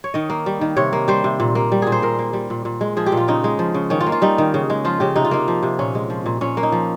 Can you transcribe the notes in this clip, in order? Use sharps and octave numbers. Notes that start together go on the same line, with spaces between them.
C#5
D#3 D#5
A#3
G3
D#3
C3 C#5
A#3
G3 C5
C3
A#2
A#3
G3
A#2 G#4
C5
A#2 A#4
A#3
G3
A#2
A#2
G#3
F3 G#4
G4
A#2
F4
C#3 D#4
G#3
F3
C#3
D#3 C#4
F4
A#3
F4
G3 D#4
D#3
C#3
G#3
F3 F4
C#3 G4
C3 D#4
F4
A#3 D#4
F3
C3
A#2 C#4
G#3
F3
A#2
A#2 C#4
A#3
D#4
F3